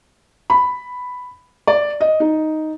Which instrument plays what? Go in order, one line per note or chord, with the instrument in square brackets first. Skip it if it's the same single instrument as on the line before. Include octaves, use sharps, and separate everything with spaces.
[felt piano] B5
D5
D#5
D#4